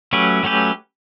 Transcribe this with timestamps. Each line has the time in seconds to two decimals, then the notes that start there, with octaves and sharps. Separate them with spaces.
0.13 F#3 A3 C#4 G4 B4
0.43 F#3 A3 C#4 G4 B4